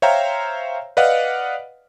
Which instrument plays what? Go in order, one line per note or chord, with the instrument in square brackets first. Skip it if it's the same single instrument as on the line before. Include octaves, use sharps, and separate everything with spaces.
[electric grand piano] C5 C#5 E5 F5 G5 A#5
B4 D5 D#5 F5 F#5